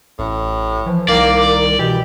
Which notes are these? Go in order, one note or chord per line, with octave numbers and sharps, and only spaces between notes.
A1 A2
E3 F3
C2 D#3 A#3 D5
B2 E3 G4